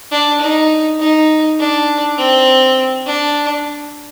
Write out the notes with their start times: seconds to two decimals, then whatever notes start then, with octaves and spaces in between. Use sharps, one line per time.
0.11 D4
0.41 D#4
1.00 D#4
1.59 D4
2.18 C4
3.06 D4